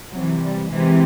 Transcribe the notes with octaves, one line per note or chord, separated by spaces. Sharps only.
C3 E3 F#3
G3
C3 E3 G#3